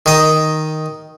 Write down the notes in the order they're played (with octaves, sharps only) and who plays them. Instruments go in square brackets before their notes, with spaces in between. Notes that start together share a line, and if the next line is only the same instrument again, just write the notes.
[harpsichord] D#3 D#5